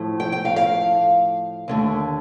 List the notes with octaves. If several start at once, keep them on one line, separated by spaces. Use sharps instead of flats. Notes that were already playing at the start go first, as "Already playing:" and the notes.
Already playing: A2 F3 A3
G5
G5
F5
F5
D#2 D3 A3